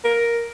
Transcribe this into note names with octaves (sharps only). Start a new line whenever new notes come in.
A#4